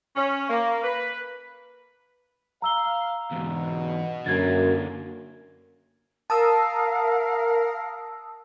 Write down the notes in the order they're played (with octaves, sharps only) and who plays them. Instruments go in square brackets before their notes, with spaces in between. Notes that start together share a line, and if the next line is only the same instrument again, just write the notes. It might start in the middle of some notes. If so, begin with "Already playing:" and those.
[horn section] C#4
A#3
B4
[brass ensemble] F5 [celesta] A#5 E6 G7
[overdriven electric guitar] E2 G#2 [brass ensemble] B2
[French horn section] F#2 [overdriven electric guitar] D3 A#3 [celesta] G#6 A6
[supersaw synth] A#4 [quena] F5 [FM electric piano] A5 D#6 E6